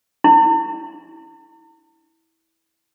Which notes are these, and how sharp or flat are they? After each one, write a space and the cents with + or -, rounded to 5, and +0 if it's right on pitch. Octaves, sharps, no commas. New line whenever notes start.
E4 -20